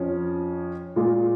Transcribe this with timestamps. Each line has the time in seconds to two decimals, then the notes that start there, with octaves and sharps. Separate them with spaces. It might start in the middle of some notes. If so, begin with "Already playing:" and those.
Already playing: F2 F3 C#4
0.96 A#2 G#3 F4